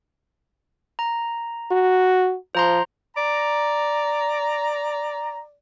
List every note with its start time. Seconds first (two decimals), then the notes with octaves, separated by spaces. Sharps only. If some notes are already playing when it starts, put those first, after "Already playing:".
0.99 A#5
1.71 F#4
2.55 F3 C5 A#5 C6
3.17 D5 A#5